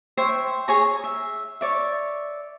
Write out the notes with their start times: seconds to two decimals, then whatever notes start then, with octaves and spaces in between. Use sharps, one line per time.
0.17 C5 C#5 E5 G5
0.68 G#4 C#5 A#5
1.04 E5
1.61 C#5 D5 E5